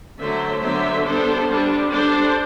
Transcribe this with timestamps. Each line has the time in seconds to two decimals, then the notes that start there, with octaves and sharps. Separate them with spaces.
0.19 D3 F#3 A3 C5 E5
0.62 D3 F#3 B3 D4 C5 E5
1.06 G3 B3 D4 A4 C5
1.49 G3 D4
1.92 G3 D4 A4 C5